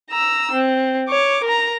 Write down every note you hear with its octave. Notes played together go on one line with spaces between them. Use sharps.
A#5 E6
C4
C#5 D6
A#4 A#5